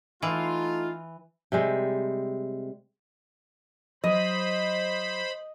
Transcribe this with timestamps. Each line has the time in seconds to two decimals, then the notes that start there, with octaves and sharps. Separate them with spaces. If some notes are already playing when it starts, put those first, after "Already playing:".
0.22 E3 A3 D#4 F4
1.52 C3 G3 G#3
4.04 F#3 C5 D#5 B5